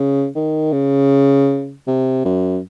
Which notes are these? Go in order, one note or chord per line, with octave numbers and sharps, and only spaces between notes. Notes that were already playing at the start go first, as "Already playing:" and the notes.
Already playing: C#3
D#3
C#3
C3
F#2